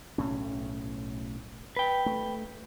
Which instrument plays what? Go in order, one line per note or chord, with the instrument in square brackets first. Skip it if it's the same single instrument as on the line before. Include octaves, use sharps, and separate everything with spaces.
[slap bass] B1 A2 C#4
[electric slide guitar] B4 G5
[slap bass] A3